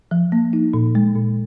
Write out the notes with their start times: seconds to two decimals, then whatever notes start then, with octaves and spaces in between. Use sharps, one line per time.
0.11 F3
0.32 A#3
0.53 D#4
0.74 A#2
0.95 G#3
1.15 A#2